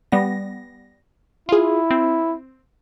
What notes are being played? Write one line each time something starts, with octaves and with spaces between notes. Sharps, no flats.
G3 B3 A#6
E4 F4 G#4
C4